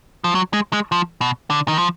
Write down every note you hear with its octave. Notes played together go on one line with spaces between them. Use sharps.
F3
F#3
G#3
G#3
F3
B2
D3
D#3
F3